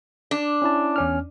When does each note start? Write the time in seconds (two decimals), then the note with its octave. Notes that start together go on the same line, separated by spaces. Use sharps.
0.31 D4
0.62 C#4 E4 A5
0.96 E2 C#4 F6